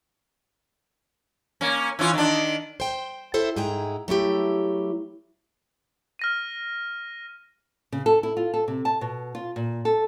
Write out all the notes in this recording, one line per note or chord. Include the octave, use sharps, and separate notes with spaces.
A#3 C#4
E3 C#4 F4
D#3 D4
C5 G5
E4 A4 C5 E5
G#2 E4 G#4 G5 A#5
F#3 A3 E4 G4
F6 A#6 D#7
C#3
A4
E4
F4
A4
C3
A5
B2
F4
A#2
A4